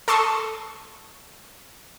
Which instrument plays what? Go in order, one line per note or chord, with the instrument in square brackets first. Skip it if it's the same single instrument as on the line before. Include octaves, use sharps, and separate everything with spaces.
[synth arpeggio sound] A4 A5 C6 C#6 D#6